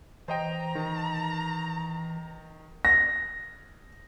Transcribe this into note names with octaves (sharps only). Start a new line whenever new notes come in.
E3 C5 D#5 G5 A#5
D#3
A#6